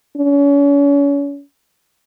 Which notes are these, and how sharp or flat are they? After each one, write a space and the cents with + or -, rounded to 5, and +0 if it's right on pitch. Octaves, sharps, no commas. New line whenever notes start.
C#4 +35